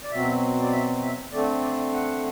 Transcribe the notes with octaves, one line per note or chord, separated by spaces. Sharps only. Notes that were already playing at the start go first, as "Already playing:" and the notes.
D5
B2 F#3 C4 E5
D5
E5
E5
D3 A3 C4 D5
D5
F#5